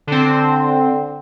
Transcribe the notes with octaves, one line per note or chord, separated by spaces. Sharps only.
D3 C4